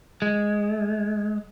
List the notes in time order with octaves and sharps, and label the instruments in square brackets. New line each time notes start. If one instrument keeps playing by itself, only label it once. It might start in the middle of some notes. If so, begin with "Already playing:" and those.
[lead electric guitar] G#3